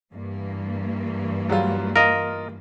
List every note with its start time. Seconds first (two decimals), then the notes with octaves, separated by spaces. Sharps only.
0.12 G2 E3 A#3
1.49 F#3 G3 F4
1.96 F4 A#4 D#5